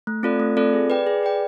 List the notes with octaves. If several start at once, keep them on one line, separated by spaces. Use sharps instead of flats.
A3
C4 F4 A4 D5
A3
C4 F4 A4 D5
G#4
B4 D5 G5
G#4
B4 D5 G5